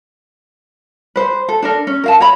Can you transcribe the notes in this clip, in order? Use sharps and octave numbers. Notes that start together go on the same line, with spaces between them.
B4 C5
A4
D4 A4 A#4
C#4
A#4 F5 A5
C#5 A#5 B5